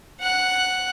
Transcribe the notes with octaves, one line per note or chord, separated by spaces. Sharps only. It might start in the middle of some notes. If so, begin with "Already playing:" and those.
F#5 F#6